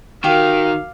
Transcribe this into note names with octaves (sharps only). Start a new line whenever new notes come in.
D#3 F#4 G4 A#4 F5